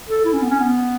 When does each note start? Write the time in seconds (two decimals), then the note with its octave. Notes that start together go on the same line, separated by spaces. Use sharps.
0.08 A4
0.25 E4
0.33 C#4
0.42 B3
0.50 C#4
0.59 B3